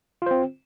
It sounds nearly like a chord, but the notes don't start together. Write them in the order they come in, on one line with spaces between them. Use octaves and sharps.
F4 C5 C4